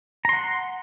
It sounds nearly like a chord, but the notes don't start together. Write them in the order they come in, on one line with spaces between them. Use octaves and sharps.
A#5 C6 F#5